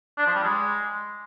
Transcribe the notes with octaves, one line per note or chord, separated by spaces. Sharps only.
D4
F3
G3
G#3